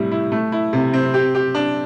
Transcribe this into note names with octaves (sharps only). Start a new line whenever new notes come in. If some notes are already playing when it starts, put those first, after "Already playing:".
Already playing: A2 C3 G3 E4
E4
A3
E4
C3
C4
G4
G4
D4